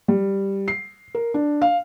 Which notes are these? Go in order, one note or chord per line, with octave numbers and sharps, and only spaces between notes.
G3
C7
A#4
D4
F5